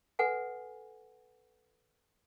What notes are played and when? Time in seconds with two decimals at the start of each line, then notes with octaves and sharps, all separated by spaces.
0.19 A4 B4 F#5 G#5